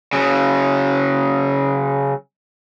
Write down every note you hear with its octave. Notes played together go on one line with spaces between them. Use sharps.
C#3 F#3